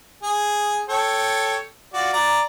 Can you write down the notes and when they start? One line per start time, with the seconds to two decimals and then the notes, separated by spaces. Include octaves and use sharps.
0.23 G#4
0.89 A4 C#5 G5
1.93 F4 F#4 D5
2.13 D5 A#5